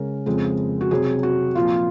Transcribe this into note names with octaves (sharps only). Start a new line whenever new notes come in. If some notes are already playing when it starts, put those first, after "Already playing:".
Already playing: C#3 G#3 C#4 A#4
F2 C#3 G#3 C4
F#4
C3 F#3 C4 G#4
F#4
A#2 F3 C4 F4